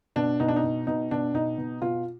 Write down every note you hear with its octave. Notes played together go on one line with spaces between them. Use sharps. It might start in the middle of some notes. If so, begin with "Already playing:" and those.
B2 D4
B2 D#4
D4
D#4
B2
B2 D#4
B2 D4
B2 D#4
B2
B2 F4